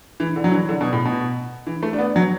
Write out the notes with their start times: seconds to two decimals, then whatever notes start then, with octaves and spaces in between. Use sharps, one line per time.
0.20 E3
0.36 D3
0.44 F#3
0.52 E3
0.69 D3
0.81 B2
0.93 A2
1.05 B2
1.67 E3
1.83 A3
1.93 D4
1.98 B3
2.16 F#3